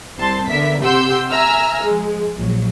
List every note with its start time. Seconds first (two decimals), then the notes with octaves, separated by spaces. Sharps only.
0.18 C2 C4 A5 C6
0.49 D3 B3 A#4 E5 B6
0.81 C3 G4 F#5 C6 E6 G6
1.30 E5 G#5 A#5 E6 F6
1.82 F3 G#3
2.37 A#1 F#3